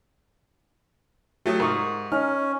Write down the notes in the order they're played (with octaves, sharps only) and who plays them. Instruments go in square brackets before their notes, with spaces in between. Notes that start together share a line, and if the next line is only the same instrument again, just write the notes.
[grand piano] F#3 A3 [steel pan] G4 D#6
[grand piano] G#2 [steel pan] A#4 C#6 D#6
[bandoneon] C#4 [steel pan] D#4 [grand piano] F6